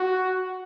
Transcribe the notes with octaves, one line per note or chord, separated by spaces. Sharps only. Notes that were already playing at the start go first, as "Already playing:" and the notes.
Already playing: F#4